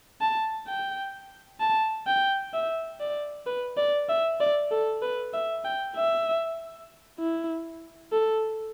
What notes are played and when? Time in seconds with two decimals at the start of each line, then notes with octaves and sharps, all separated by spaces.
0.21 A5
0.67 G5
1.60 A5
2.07 G5
2.54 E5
3.00 D5
3.47 B4
3.77 D5
4.09 E5
4.40 D5
4.71 A4
5.02 B4
5.33 E5
5.64 G5
5.96 E5
7.19 E4
8.13 A4